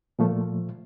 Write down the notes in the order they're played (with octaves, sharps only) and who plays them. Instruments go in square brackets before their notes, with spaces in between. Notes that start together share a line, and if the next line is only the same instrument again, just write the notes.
[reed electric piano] A#2 F3 A3